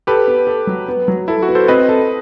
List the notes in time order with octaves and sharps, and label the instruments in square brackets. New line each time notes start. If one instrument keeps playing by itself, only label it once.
[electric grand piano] G4 B4 [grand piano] A4
[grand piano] B3
A4
F#3
B3
F#3
[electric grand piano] E4 [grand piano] A4
[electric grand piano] F#4
[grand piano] B3
[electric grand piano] A4 C5
[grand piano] C4 [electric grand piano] B4 D#5
[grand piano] A4